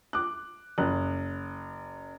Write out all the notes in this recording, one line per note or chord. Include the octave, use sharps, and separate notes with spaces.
D6 F#6
F#1 F#6